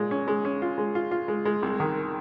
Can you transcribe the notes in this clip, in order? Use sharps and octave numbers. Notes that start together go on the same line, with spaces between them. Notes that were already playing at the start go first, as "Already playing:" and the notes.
Already playing: A#2 G#3
C#4
G#3
C#4
F4
G#3
F4
F4
G#3
G#3
C2
D#3